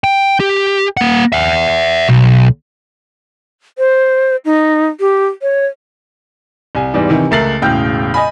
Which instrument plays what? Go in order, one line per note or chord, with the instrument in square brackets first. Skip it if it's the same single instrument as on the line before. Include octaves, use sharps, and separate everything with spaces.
[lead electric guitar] G5
G4
A#3 F#5
E5 F#5
B1
[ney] C5
D#4
G4
C#5
[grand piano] C2 G#5
E2 G#2 E3 G3
C3 D#3 E3
C#2 A3 A#4 A6 C7 F#7
E1 A2 C#3 G5 F6 G6
D#5 G#5 B5